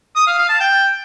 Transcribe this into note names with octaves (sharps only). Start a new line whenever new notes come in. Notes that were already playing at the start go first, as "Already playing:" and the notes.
D#6
F5
F5
A5
G5